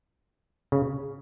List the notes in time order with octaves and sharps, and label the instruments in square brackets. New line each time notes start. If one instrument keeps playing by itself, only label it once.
[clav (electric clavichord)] C#3